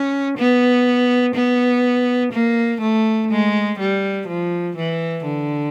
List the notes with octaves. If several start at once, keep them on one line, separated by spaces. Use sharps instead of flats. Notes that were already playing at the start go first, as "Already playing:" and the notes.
Already playing: C#4
B3
B3
A#3
A3
G#3
G3
F3
E3
D3